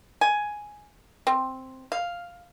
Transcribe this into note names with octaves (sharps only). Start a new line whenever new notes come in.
G#5
C4
F5